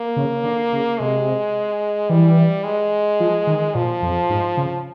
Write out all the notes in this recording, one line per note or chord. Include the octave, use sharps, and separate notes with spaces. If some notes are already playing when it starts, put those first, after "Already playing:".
Already playing: A#3
C#3
D3
C#3
C3 G#3
E3 G3
G#3
F3
D#3
A#2 F3
F2
G#2
C#3